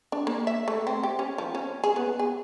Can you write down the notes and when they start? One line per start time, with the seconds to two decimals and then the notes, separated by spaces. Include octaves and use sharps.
0.12 D4
0.27 A#3
0.47 E5
0.68 A3
0.87 C4
1.03 G4
1.19 C#4
1.38 F3
1.55 C#4
1.84 G#4
1.96 B3
2.19 G#4